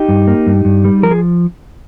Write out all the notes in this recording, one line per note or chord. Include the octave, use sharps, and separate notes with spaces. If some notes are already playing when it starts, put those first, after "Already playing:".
Already playing: D#4 G4
G2
A#3
G2
G2
G3
F3 A#4
G#4